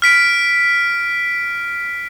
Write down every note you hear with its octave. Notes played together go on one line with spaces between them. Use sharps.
F6 B6 D7